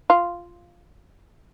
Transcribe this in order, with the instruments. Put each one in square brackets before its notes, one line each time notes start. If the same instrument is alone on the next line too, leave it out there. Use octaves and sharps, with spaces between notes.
[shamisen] F4